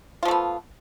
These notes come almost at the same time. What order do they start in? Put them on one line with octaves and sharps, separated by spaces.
F4 F3 A3 B3